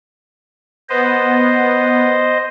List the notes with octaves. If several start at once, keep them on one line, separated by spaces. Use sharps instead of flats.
B3 C5 D#5